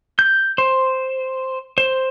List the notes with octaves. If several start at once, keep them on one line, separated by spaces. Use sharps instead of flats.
G6
C5
C5